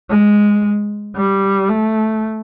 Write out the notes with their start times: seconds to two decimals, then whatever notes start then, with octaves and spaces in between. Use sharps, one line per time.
0.10 G#3
1.16 G3
1.69 A3